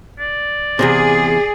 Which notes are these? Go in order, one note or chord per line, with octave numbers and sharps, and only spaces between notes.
D5
E2 G#2 C3 G#4